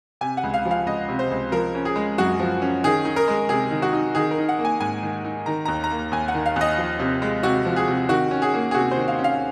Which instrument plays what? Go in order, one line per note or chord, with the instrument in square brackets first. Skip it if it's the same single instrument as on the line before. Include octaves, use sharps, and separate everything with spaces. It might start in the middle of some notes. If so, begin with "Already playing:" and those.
[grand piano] C3 G#5
F#5
C#2
F5
F3
F5
C#2 D#5
C3
C5
C#2
F3 A#4
C#4
G#4
G#3
F#2 F#4
F3
C#4
D#3 G#4
D#4
A#4
G#3
C3 G#4
D#3
F#4
D#4
D#3 G#4
A#4
D#4
F#5
A#3
G#5
G#2 G#5
D#3
D#4
D#3 A#5
D#2 A#5
A#5
A#3
D#2 G#5
F#5
D#3
F5
D#2 D#5
F3
C3
G#3
C3 F#4
F3
G#4
C3
D#3 F#4
C#4
G#4
A#3
G#4
C3 F#4
C5
D#3
F5
C#4
F5